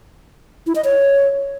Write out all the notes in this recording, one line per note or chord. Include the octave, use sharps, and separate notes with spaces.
E4
D#5
C#5